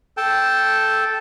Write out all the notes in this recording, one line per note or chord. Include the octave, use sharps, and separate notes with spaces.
A4 G5 A5